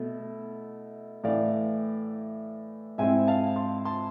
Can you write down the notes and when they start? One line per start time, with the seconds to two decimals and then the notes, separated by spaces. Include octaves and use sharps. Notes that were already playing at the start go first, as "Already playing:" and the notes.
Already playing: B2 A3 E4
1.24 A2 E3 A3 E4 D5 F5
2.98 G#2 G#3 C4 E4 E5 G#5
3.27 F5 A5
3.56 A5 C6
3.85 A5 C6